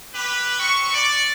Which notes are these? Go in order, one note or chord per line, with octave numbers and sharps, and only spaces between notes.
G4 B4
C4 C#6
D5